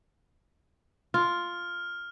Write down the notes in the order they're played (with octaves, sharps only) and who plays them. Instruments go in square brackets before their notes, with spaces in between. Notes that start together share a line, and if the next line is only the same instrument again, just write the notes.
[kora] F4 [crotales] F6